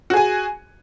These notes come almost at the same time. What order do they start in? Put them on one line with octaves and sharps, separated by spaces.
F#4 G#4 G#5